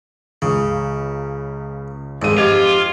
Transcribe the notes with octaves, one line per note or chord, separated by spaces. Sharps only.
C#2 C#3
G#1 F2 G#3 D#7
F4 G4 D#5 D6 G#6